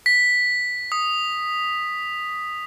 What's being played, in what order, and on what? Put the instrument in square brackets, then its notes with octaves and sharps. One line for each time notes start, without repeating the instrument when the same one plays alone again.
[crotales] B6
D#6